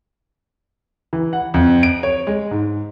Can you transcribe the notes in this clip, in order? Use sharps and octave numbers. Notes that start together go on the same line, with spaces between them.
E3
F#5
F2
D7
C#5
G#3
G#2